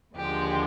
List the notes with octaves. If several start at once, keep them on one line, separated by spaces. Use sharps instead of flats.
D#2 D3 F3 G#3 G4